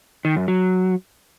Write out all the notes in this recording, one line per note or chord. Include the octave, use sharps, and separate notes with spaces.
D#3
F#2
F#3